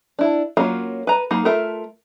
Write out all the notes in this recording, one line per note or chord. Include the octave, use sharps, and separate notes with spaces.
D4 E4
F#3 A#3 C#4 F4 F#4
B4 A#5
F#3 A#3 D#4 G#4 A#5
A3 F4 A#4 E5